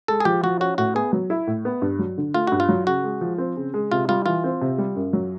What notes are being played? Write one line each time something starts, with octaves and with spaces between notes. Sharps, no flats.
G#3 A4
G#4
F3 G4
F3 F#4
C#4 F#4
A2 F#4
B3 G#4
F#3
E4
A2
B3
G2
F#3
D3
A3 F4
G2 F#4
F4
F#3
C#3 F#4
G#3
F3
C4
C#3
G#3
C3 F4
G3 F4
E3 F4
C4
C3
G3
F#2
F#3